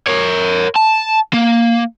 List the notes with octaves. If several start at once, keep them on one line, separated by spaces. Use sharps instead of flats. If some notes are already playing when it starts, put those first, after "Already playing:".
A#4 C#5
A5
A#3